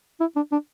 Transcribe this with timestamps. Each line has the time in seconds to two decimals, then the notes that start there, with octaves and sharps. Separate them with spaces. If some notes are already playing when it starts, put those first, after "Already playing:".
0.20 E4
0.36 D4
0.52 D4